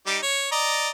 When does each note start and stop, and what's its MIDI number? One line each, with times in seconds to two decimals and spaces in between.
0.07 0.18 55
0.07 0.18 63
0.07 0.18 86
0.23 0.49 73
0.52 0.89 74
0.52 0.89 75
0.52 0.89 82